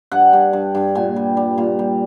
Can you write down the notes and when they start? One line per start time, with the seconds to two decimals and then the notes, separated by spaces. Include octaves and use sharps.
0.12 G2 F#5
0.33 G2
0.53 G2
0.75 G2
0.95 A#2 G#5
1.16 G3
1.37 G3
1.58 A#2
1.79 G3